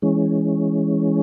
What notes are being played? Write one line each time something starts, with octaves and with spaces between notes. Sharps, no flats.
E3 G#3 C#4